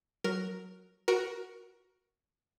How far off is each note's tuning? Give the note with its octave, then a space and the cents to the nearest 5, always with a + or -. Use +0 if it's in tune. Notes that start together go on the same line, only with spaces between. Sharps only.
F#3 +0 A#4 +0
F#4 +5 A#4 +15